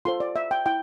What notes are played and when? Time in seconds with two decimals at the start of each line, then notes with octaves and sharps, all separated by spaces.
0.05 F4 A4 C5 C6
0.20 D5
0.36 E5
0.51 G5
0.66 E4 G5